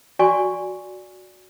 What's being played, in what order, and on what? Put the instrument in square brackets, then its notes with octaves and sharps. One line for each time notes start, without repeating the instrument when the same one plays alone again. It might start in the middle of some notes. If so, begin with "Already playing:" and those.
[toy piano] F#4 D5 G#5 C6 C#6